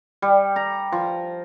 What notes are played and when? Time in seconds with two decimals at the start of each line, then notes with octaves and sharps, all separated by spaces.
0.22 G3
0.56 A#5
0.92 F3